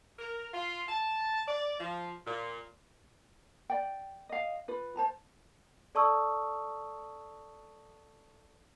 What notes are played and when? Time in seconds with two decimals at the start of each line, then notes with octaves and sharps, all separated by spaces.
0.18 A#4
0.54 F4
0.88 A5
1.46 D5
1.79 F3
2.26 A#2
3.70 D5 G5
4.29 D#5 F5
4.68 F4 B4
4.96 C5 A5 A#5
5.95 A4 D5 A5 C#6 D#6 E6